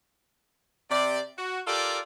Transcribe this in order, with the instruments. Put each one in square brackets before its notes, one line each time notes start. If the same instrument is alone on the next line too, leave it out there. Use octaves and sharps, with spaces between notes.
[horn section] C3 D5
F#4
F4 G4 A4 A#4 D5